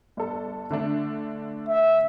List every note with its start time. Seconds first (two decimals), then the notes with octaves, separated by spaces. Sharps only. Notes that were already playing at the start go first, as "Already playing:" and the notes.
0.17 G1 A4
0.71 D3 A3 D4
1.68 E5